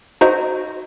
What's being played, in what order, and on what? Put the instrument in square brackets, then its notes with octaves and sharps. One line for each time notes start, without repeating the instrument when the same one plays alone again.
[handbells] D#4 F#4 C5 D#5